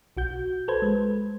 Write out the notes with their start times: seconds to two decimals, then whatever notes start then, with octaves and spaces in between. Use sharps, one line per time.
0.17 B1 F#4 G6
0.68 A4 B4 C5 G#6
0.82 G#3